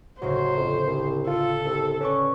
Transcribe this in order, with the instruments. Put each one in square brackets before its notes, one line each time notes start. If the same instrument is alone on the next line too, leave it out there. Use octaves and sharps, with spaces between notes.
[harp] G1 A2 C#3 [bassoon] F#3 [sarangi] C5
[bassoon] F2
C2
[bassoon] F4 [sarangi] A4
[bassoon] C2
[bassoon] C#4 [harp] B4 D5 C#6